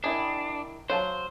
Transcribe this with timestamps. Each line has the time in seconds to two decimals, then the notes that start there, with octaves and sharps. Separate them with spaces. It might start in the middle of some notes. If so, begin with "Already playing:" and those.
0.04 D#3 D4 E4 G#4
0.90 F#3 C5 F5 A5